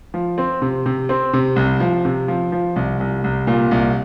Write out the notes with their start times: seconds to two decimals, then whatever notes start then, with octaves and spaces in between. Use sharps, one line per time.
0.14 F3
0.38 C4
0.62 C3
0.86 C3
1.09 C4
1.33 C3
1.56 C2
1.80 F3
2.05 C3
2.28 F3
2.52 F3
2.76 C2
3.00 C2
3.24 C2
3.47 A#2
3.71 C2